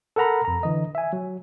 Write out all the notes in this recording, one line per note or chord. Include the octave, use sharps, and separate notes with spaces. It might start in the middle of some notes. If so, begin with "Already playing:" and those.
A4 A#4 F#5 A#5 B5
F2 A#5
D3 E3 D#5
E5 G#5
F#3